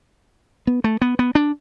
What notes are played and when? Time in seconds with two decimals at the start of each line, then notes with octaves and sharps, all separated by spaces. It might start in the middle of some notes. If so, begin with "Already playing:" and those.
0.67 B3
0.84 A3
1.02 B3
1.19 B3
1.35 D4